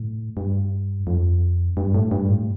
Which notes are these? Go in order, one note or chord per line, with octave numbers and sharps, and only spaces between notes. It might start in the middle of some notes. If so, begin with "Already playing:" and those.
Already playing: A2
G2
F2
G2
A2
G2
A2